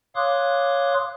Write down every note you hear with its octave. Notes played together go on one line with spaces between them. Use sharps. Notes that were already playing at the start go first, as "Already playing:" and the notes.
C#5 F5 C6 D6 D#6 F#6